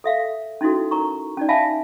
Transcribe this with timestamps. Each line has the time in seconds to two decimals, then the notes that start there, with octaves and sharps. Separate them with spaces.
0.04 A4 E5 F5
0.61 C#4 D#4 E4 F#4 A4
0.91 A#4 A#5 C#6
1.37 C#4 D#4 D5
1.49 E5 F5 G#5 A5 B5